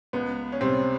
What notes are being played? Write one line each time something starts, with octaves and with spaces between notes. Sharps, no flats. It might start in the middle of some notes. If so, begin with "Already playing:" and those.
C#2 B3
C#4
C3 G3 C4